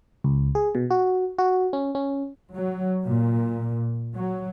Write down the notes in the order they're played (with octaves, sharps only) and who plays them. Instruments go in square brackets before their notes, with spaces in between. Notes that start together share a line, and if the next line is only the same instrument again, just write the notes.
[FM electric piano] C#2
G#4
B2
F#4
F#4
C#4
C#4
[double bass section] F#3
A#2
F#3